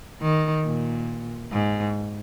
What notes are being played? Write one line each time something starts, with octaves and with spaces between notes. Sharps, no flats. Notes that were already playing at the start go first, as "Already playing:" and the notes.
D#3
A#2
G#2